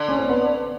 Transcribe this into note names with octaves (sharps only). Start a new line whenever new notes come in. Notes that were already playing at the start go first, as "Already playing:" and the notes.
Already playing: D3
C#4
C4
B3